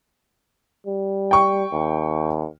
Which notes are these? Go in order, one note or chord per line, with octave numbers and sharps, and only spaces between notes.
G3
G5 C#6
D#2